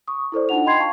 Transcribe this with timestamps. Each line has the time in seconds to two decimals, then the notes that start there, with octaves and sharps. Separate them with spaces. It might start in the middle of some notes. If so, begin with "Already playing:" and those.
0.08 C#6 D#6
0.32 E4 A4 C5 D5
0.49 D4 D#4 F4 F#5 F7
0.65 D#5 G5 B5 C6 G#6 C7
0.79 F5 A5 C#6